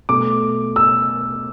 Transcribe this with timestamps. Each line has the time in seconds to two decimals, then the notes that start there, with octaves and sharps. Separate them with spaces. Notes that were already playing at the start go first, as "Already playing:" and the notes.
0.09 B2 A3 D6
0.76 E6